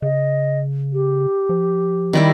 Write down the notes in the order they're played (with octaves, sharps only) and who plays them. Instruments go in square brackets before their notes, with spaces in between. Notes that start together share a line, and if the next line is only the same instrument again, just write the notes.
[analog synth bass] C#3 [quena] D#5
[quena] G4
[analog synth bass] F3
[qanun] D#3 G3 E4